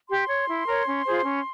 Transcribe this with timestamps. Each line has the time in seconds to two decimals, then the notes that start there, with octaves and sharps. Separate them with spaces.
0.09 G4 C6
0.28 C#5
0.48 E4
0.67 A#4 C#5
0.87 C#4
1.06 F4 G#4 C5
1.24 C#4